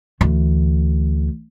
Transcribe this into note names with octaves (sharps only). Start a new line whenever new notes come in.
D2 E3